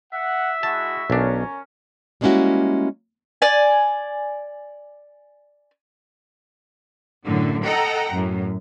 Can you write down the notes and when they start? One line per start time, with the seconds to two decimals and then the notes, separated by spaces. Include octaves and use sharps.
0.13 E5 F#5
0.63 G#3 E4 F#4 A5
1.10 B1 C#4 D4 A#4
2.21 G3 G#3 A#3 C#4 E4 F#4
3.42 D5 G#5
7.25 F#2 A2 D3 F#3
7.64 A4 D#5 F#5 G5 A#5
8.12 F#2 A2